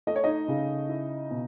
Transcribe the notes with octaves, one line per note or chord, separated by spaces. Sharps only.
A3 D#5
C#5
D#4 D#5
C#3
E4
B2